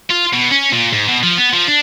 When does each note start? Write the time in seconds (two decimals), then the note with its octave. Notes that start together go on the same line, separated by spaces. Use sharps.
0.10 F4
0.33 B2
0.52 C#4
0.73 A#2
0.93 G#2
1.09 B2
1.23 F3
1.37 B3
1.53 F3
1.67 D4